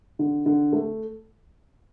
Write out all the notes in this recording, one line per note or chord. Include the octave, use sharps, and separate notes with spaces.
D3
D3
A3